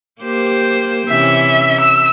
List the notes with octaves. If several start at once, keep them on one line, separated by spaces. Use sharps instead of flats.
A#3 G4 C5
C3 E3 C#4 E5
E6